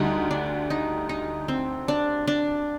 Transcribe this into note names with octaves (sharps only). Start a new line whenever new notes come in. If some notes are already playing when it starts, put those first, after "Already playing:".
Already playing: D2 D3 G3 D#4
D4
D#4
D#4
C4
D4
D4